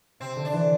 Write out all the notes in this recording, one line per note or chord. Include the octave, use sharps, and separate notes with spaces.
C3 C4
D3
D4
E3